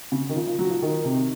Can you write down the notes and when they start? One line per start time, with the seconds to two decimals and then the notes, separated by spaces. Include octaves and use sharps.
0.12 C#3
0.29 D#3
0.35 F3
0.47 F3
0.59 F#3
0.70 F3
0.82 D#3
1.05 C3